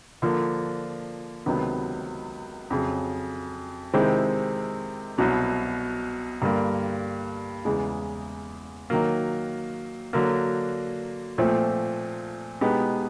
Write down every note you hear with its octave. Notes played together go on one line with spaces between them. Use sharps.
D3 F3 A#3
C#2 C3 D#3 F#3 B3
F2 C#3 F#3
C3 D#3 G#3 C4 E4
C2 B2 F#3
G2 D3 G3 A#3
E2 C#3 E3 G#3
D#3 F#3 A#3
D3 F#3 A#3
A#2 F3 A3 C4
B2 G#3 B3 D#4 G4